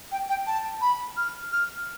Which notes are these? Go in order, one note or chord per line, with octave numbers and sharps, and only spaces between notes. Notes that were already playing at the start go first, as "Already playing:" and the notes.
G5
G5
A5
B5
F6
F6